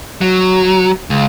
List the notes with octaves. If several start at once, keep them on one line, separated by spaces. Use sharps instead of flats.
F#3
C#2